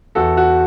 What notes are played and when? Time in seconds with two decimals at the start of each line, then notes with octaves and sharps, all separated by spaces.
0.15 E2 F#4 A4
0.37 F#4